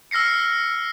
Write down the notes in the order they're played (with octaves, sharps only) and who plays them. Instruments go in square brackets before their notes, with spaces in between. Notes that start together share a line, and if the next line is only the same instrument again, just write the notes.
[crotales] E6 F6 A#6 C7 C#7